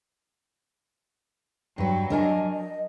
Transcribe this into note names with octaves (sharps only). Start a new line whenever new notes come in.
G2 F#3 B4 G5
D4 A#4 D#5 G#5
D#5